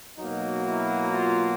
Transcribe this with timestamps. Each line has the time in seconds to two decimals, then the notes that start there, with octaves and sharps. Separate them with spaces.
0.18 B2 F#3 A#3 D#4
0.65 E4
1.11 F4